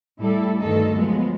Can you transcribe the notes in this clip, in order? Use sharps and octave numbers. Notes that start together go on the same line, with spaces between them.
A2 G3 E4 A4
D2 G2 D#3 D#4 A4
F3 F#3 G#3 B3